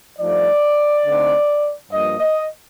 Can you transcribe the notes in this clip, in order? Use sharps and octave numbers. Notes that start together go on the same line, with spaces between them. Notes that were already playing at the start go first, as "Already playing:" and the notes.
G2 F3 A3 D#4 D5
D3 A3 C4 D#4
G2 F3 A#3 D#5
D#5